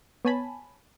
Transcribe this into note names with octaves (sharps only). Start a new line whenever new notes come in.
B3 C#5 G#5 A5 B5